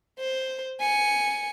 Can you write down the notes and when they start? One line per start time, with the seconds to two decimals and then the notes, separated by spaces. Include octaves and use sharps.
0.19 C5
0.80 G#5 C#7